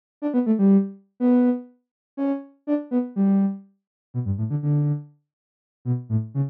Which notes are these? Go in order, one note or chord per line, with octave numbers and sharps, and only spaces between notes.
D4
B3
A3
G3
B3
C#4
D4
B3
G3
B2
G2
A2
D3
D3
B2
A2
C#3